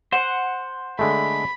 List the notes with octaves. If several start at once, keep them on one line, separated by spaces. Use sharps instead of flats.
C5 F#5
D3 G#3 A3 B5